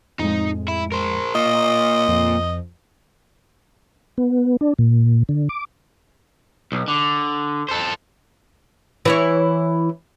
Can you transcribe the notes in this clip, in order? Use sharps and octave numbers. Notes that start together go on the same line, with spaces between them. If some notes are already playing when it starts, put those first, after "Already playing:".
F2 A2 G#3 D#4
E4
A#4 C5
A#3 F4 D#5 C#6
F2 F3
B3
D4
A#2
D3
D6
B1
D3
A4 C5
E3 E4 C#5